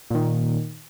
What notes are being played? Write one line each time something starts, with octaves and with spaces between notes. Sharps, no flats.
A#2 D#3